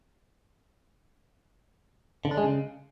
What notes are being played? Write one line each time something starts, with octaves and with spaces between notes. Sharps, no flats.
D3
D4
G#3
C#3